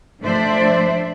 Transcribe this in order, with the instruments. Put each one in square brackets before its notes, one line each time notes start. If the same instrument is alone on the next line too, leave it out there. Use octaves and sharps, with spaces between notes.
[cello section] F3 A3 D4 C5 D5 E5